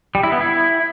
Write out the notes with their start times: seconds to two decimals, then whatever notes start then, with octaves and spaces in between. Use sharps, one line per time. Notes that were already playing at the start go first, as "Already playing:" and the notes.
0.15 G3
0.23 E4
0.32 B3
0.41 E4